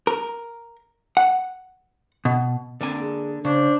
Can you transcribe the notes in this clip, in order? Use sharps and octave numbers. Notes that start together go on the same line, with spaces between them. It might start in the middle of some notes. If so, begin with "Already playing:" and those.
A#4
F#5
B2
D3 A#3 C4 G#5
G#4
C#3 D4 C5